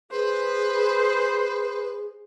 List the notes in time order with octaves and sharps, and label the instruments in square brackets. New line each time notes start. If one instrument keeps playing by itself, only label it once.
[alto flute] G#4 [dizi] B4 [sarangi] C5